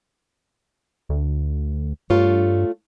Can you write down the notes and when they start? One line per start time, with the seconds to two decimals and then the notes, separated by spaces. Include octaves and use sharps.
1.09 D2
2.10 G2 A3 F4 C#5